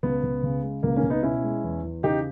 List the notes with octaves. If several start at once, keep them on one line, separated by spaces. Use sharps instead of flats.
C#2 B3
C#2
C#3
G#3
C#2 A#3
A#3 C#4
C#2
B3 D#4
B2 C#4 E4
G#3
E2
E2
C#3 D#4 G4